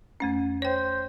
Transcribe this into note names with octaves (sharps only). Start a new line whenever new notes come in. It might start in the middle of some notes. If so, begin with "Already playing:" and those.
F2 A3 C#4
C5 C#5 G5